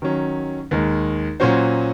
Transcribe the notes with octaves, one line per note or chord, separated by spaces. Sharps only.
D#3 F#3 C#4
D#2 D#3 G#3
A#2 F#3 C#4 F#4 C5